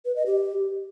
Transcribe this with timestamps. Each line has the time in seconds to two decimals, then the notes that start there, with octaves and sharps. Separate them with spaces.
0.05 B4
0.16 D#5
0.26 G4